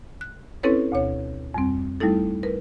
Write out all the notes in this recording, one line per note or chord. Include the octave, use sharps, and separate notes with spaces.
F#6
C4 C#4 E4 A4 B4 C#5
D2 B2 C#5
F2 G3 C4
G3 A3 D#4 E4 A4
A#4 B4